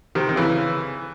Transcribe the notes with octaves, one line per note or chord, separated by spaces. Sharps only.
C3 D#3
D#3
C#3 E3